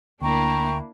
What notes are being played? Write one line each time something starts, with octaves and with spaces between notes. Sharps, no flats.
D2 A#3 D4 E4 G5 A#5 C#6